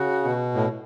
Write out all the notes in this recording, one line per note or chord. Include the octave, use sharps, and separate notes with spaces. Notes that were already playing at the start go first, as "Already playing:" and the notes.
Already playing: C#3 F#4
B2
A2